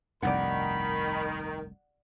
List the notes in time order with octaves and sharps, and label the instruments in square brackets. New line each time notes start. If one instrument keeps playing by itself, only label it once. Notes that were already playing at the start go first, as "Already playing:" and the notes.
[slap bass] F1 C2 G2 [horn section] D#3 [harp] D5 F#5 [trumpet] B5